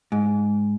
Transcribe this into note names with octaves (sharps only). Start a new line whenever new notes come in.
G#2